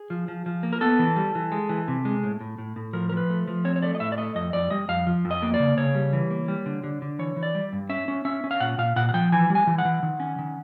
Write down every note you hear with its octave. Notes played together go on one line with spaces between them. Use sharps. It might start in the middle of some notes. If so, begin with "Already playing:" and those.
Already playing: G#4
F3
F3
F3
A#3
A#4
B3 A4
E3
G3
E3
G#3
E3
C3
G#3
A2
A2
A2
A2
F3 A#4
A#4
F3 B4
A3
F3
C4 C#5
C#5
A3 D5
D#5
A2 E5
D5
A3 D#5
F2 D#5
F2 D5
G3 D#5
F2 F5
F3
F2
D#5
A#3
D5
C#3
C#3 C#5
G3
E3
A#3
G3
D3
D3
D3
E3 C#5
E3
D5
G3
G2
C#4 E5
C#4
C#4 E5
C#4
F5
A#2 F#5
A#2 F5
A#2 F#5
F#5
F3 G5
E3 G#5
G3
G#5
E3
F#5
E3
D#3
C#4
D#3